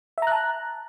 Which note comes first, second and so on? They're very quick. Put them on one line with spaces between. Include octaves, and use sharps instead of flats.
E5 A#5 F#6 A5